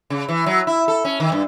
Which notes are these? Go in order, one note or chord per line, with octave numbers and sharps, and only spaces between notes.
C#3
E3
F#3
E4
A4
C#4
D#3
G2